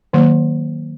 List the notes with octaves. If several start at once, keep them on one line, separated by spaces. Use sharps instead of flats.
D#3 F#3 A#3